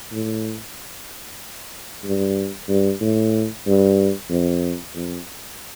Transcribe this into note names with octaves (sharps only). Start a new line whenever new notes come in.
A2
G2
G2
A2
G2
F2
F2